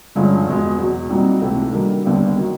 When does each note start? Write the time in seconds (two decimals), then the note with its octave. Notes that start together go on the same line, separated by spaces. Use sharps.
0.15 G2 D3 F3 G#3 C#4
0.47 E2 B2 G#3
0.78 E2 B2 F#3
1.10 A#2 G3 C4 D#4 F#4
1.41 C#2 C3 E3 A3
1.73 D#3 G3 A#3 D4 F#4
2.04 D#2 D3 G3 B3
2.36 D#3 F#3